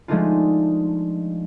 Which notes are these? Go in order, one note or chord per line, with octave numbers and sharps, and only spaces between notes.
F3 G#3 A3 D4 D#4 F4